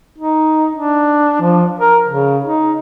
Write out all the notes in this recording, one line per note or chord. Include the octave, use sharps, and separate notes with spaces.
D#4
D4
F3
A#4
C#3
D#4